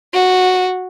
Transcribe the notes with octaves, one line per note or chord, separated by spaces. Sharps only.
F#4